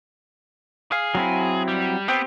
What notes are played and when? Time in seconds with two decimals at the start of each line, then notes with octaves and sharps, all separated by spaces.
0.92 G#4 F5
1.15 F#3 C4 E4
1.68 G3
2.08 B3 C4 G4